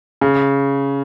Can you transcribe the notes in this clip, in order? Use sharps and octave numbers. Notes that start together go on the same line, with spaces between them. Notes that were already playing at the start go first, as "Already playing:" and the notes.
C#3